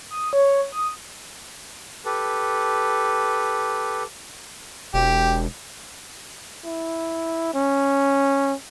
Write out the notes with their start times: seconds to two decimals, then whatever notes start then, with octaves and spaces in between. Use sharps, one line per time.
0.10 D#6
0.33 C#5
0.72 D#6
2.05 G4 A4 B4
4.94 E1 G4
6.65 E4
7.54 C#4